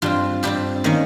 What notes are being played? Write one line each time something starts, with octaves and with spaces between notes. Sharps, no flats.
G2 G3 C4 F4
G2 G3 C4 G4
D#3 A#3 C#4